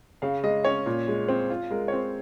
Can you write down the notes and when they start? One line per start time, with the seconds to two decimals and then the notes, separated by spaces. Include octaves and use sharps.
0.22 C#3 F5
0.44 G#3 D#5
0.65 C#4 C#5
0.86 A#2
1.08 G#3
1.29 C4
1.50 F4
1.71 G#3 A#4
1.88 C#5
1.92 C4 C5